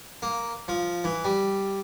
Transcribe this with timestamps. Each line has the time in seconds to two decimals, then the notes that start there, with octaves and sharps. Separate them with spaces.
0.22 A#3
0.68 F3
1.04 E3
1.25 G3